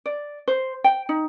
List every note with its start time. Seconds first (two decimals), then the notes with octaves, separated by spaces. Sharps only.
0.06 D5
0.48 C5
0.84 G5
1.09 D#4